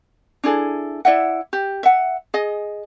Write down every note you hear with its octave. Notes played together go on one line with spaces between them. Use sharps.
D4 E4 G#4 A4
E4 D5 E5 F#5
G4
E5 F#5
G#4 D#5